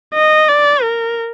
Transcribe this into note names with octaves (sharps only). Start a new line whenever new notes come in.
D#5
D5
A#4